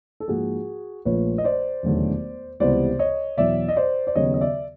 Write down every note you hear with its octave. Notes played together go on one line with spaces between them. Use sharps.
A4
G#2 F3 A#3 F#4 G#4
A#1 A#2 F3 A3 B4 C#5
D#5
C5 D5
E1 D#2 D3 F#3 A3
C#2 C3 E3 G3 B3 C5 D5
C#5 D#5
E2 B2 F#3 D5 E5
D#5
C5 D5
D5
D#2 C#3 F#3 B3 C#5 D#5
D#5
D5 E5